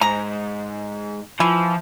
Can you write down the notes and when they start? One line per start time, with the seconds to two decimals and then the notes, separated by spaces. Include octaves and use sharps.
0.01 G#2 A#5
1.40 E3 F3